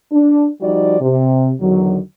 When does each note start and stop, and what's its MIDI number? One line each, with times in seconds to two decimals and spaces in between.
0.12 0.47 62
0.62 0.96 53
0.62 0.96 55
0.62 0.96 63
0.62 0.96 66
0.62 0.96 74
1.01 1.51 48
1.60 1.99 40
1.60 1.99 50
1.60 1.99 51
1.60 1.99 54